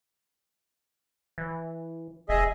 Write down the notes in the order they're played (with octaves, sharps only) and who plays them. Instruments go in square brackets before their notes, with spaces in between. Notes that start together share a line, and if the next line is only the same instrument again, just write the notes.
[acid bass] E3
[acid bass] F1 [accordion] G#4 D#5 E5